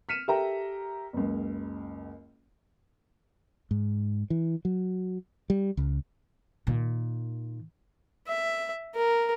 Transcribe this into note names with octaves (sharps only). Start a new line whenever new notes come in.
F6 B6 C#7 D#7 E7
G4 A4 A#4 E5 G5 A#5
F#1 C#2
G#2
E3
F#3
G3
C#2
A#2 D#3
E5
A#4